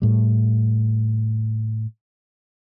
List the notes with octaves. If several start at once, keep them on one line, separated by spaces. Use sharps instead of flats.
A2 G3